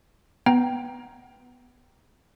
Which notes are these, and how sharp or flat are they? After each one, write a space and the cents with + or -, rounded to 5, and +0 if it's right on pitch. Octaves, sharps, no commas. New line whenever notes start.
B3 +0 G5 -5 A#5 +10